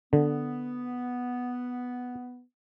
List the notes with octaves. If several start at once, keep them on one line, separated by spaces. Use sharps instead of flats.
D3 B3